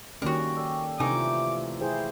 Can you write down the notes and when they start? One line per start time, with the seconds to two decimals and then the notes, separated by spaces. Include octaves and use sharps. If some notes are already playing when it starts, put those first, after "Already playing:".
0.22 D#3 G3 A#3 C#4 F#4 A#4
0.56 G4 A4 D5
1.00 C3 E3 F3 A3 D#4 G#5 D6
1.81 E4 G#4 C5 G5